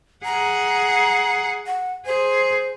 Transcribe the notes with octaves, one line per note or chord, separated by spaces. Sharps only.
G#4 F#5 A#5
F#5
G#4 C5